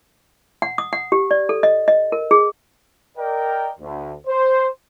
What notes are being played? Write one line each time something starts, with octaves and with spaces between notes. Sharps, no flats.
F#5
D#6
F#5
G4
D5
A4
D#5
D#5
A#4
G#4
A#4 D5 D#5 G5
D2
C5